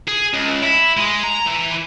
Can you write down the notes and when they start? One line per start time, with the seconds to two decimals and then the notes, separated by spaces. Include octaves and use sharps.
0.08 G#4
0.33 C#2
0.63 E4
0.97 G#3
1.23 A#5
1.46 E3